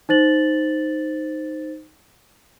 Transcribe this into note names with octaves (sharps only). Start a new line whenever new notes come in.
D#4 C5 A6 F#7